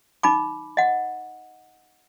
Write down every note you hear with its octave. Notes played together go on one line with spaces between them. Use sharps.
D#4 B5 D6
D#5 F#5